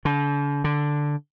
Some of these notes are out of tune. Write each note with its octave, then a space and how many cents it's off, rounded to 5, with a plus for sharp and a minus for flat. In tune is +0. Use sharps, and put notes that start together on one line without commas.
D3 -40
D3 +0